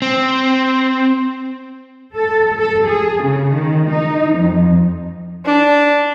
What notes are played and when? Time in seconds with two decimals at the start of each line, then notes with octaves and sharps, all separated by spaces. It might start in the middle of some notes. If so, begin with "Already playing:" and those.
0.02 C4
2.16 A4
2.59 A4
2.87 G#4
3.23 C#3
3.53 D#3
3.90 D#4
4.36 F2
5.46 D4